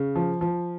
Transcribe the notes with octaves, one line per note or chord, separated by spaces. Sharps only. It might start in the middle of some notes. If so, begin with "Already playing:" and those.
Already playing: C#3
F3
F3